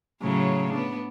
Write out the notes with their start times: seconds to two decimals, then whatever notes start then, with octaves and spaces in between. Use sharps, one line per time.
0.21 A2 C#3 F#3
0.72 B3 D4